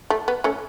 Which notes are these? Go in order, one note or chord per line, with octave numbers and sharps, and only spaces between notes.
A3
B3
A3 C#4